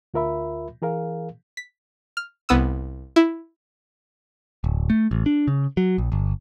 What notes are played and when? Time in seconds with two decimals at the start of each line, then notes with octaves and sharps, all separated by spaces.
0.14 D2 F4 A#4 E5 B5
0.82 E3 G#4 A#4 F5
1.57 B6
2.17 F6
2.49 C2 B3 D#6 E6
3.16 E4
4.64 D1
4.90 A3
5.11 A1
5.26 D4
5.48 C#3
5.77 F#3
5.98 A#1
6.12 G1